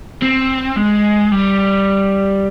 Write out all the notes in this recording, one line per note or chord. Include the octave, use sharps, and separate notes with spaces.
C4
G#3
G3